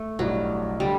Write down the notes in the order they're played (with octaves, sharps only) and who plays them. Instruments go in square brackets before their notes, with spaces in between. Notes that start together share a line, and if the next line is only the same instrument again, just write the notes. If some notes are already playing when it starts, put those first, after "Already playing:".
Already playing: [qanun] A3
[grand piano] B1 A2 G3 D4 [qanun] F#3
[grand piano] D3 [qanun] G3